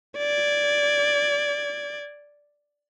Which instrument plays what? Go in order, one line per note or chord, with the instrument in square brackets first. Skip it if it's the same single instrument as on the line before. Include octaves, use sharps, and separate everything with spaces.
[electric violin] D5 G#6